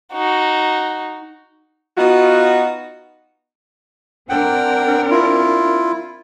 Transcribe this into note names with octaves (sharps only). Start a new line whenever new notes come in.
D#4 F#4
B3 D#4 F4 F#4
C4 D4 A#4 F#5 G5
E4 F4